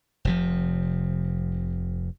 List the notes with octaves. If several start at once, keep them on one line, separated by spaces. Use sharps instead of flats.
F1 C3 F3